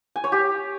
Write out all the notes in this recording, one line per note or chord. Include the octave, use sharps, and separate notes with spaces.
G#5
C#5
G4